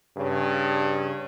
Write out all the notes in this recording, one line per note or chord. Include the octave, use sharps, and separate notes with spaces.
G2 C#3